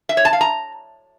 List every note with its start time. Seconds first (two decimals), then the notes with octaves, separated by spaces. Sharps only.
0.09 E5
0.17 C#5
0.25 A5
0.33 F5
0.41 A#5